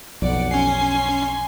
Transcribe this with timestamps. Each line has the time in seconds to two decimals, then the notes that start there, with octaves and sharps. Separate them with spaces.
0.22 B1 F2 D5 F#5
0.51 C#4 G#5 C6 C7